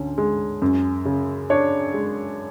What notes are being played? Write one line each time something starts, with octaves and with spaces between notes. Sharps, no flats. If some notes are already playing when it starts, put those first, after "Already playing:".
Already playing: D2 D3 C#4
G#3
F#2
C#3
D4 C#5
G#3